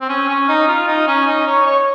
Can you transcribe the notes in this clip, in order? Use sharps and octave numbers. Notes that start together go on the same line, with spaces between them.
C4
C#4
C#4
D#4
F4
D#4
C#4
D#4
C#5
C#5